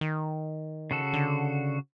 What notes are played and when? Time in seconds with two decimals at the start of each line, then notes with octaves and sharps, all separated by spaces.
0.01 D#3
0.91 C#3 F#4 A4
1.14 D3